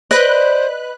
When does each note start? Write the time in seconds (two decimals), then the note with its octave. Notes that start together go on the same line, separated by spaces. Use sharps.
0.11 B4 C5 D5 D#5 F#6